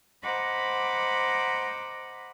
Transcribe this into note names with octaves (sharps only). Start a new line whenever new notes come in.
C5 D#5 F#5 A#5 B5 D6